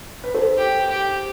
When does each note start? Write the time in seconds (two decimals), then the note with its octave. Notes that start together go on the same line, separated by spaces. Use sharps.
0.24 B4
0.34 A4 C5
0.57 G4
0.89 G4